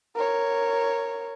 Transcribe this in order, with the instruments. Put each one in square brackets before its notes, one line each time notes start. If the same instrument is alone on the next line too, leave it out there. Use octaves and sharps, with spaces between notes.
[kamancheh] A#4 C#5